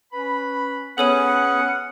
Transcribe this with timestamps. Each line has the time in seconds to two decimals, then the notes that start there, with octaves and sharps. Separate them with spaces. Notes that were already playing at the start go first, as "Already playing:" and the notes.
0.13 C#4 B4 B5
0.98 B3 C#4 G#4 A4 B4 C#5 F#5 D#7